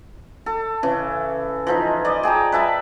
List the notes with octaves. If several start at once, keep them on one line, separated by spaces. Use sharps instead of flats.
A4
C#3 E3
E3 F3 D#4
D5 D#5
G#4 G5 A5 A#5
B4 E5 A5 B5